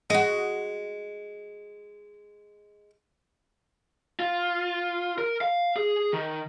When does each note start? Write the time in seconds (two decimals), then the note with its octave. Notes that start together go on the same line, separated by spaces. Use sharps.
0.10 G#3 F#4 D#5
4.19 F4
5.18 A#4
5.41 F5
5.76 G#4
6.13 D#3